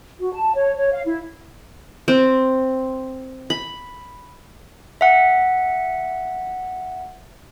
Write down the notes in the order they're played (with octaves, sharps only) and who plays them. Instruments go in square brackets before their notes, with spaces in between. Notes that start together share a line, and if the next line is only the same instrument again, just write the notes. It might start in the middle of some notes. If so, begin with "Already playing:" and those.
[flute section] F#4
A5
C#5
C#5
F5
E4
[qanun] C4
B5
[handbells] E5 F#5